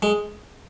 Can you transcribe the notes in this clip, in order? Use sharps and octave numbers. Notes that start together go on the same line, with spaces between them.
G#3